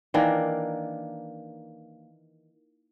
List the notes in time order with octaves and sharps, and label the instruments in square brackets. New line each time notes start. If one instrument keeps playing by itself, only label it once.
[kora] D#3 E3 A#3 D4